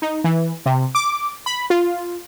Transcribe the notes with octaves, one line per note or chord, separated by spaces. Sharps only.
D#4
E3
C3
D6
B5
F4